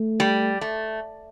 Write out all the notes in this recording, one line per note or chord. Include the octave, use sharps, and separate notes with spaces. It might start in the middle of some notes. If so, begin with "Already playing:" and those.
Already playing: A3
G3
A3